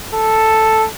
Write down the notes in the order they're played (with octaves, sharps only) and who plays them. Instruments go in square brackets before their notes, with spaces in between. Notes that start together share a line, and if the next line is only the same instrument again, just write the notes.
[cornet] A4